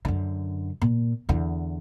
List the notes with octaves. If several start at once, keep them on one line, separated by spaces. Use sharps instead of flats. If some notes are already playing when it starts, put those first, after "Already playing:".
F#2 D3
A#2
E2 D3